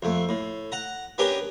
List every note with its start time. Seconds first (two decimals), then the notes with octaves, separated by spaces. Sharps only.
0.03 F2 A3
0.29 A2
0.72 F#5 A#5
1.18 B3 C#4 D4 G4 A#4 B4